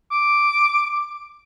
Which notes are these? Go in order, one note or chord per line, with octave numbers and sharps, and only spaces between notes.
D6